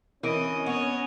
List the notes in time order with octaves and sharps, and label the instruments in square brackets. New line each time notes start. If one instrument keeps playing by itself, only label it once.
[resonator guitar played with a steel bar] E3 [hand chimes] C4 A#4 D7 [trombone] C#4 [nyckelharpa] D#5
[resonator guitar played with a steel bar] B3 [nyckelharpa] C#5 D#5